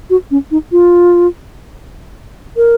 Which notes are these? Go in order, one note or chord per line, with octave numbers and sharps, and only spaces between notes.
F#4
C#4
D#4
F4
A#4